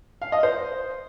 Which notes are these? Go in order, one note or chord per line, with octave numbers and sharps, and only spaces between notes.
F5
D#5
C5